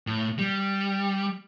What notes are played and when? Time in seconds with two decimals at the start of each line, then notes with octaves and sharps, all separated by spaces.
0.07 A2
0.39 G3